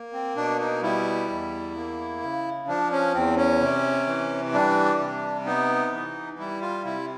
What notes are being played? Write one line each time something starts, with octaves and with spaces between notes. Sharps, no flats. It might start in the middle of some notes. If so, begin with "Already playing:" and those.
Already playing: A#3
C4
B2 D4
D#4
G3 E4
E2
A#3
C#3
F3 D4
C#4
E2 C4
C#4
C3
E3
G3 D4
C3
B3 D#4
E3
G3 E4
F4
C3 E4